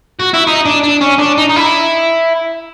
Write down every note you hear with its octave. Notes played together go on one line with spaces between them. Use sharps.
F#4
E4
D#4
D4
D4
C#4
D4
D#4
D#4
E4